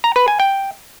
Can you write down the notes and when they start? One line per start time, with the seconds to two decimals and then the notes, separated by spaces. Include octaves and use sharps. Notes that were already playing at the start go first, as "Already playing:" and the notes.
0.04 A#5
0.16 B4
0.28 G#5
0.40 G5